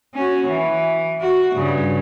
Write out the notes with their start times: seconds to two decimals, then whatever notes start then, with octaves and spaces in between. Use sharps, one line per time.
0.14 C#4 F#4
0.48 E3
1.21 F#4
1.55 G2 C#3